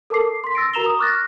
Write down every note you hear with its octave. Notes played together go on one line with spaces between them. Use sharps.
A4 A#4 A5 D6 C7
C6 B6
E6 A6 A#6 C7 D7
F#4 A#4 A#5 E7 F7 G7
D#6
C#6 D6 F6 F#6 A6 A#6